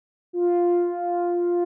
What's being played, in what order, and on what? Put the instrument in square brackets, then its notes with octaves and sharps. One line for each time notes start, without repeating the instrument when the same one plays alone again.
[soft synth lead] F4